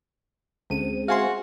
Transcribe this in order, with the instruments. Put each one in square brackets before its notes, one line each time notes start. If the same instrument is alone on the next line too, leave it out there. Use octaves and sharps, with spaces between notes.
[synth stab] D2 D#7 [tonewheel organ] G#3 C4 [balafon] C#4
[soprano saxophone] F#4 [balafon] G#4 E5 [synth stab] F5 G#5 C6